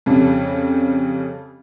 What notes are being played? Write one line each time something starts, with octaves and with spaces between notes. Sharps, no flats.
F2 C#3 G3